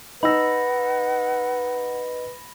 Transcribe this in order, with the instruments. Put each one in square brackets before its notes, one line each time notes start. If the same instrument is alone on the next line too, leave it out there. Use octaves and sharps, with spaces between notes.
[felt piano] D#4 E6 [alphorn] B4 [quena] F#5 [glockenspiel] B5 A#6